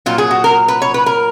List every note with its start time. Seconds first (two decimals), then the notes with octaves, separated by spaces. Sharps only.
0.06 A#2 F#3 F4
0.18 G#4
0.31 F#4
0.44 A#4
0.68 B4
0.82 C#5
0.94 B4
1.06 A#4